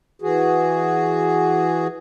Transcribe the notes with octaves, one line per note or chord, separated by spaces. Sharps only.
E3 F#4 G#4